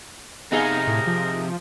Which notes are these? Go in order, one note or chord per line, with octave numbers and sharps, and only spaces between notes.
C3 B3 D#4 G#4 A#4 F5
A2
F3